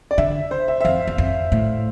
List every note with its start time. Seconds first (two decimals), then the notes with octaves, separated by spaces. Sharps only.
0.11 D5
0.18 D3 E5
0.51 C5
0.68 E5
0.81 E5
0.84 F2 F5
1.08 E2
1.18 F2
1.52 A2